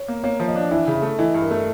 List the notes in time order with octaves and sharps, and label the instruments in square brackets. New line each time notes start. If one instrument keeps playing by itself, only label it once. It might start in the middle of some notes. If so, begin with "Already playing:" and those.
Already playing: [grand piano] C#5
[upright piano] A#3
[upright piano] A#3 [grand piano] C#5
[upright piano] F3
[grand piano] D#5
[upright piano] D4
[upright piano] E3 [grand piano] E5
[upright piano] C#3
[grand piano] E5
[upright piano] A3
[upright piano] E3 [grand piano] D#5
[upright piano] G2
[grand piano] A#4
[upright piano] A3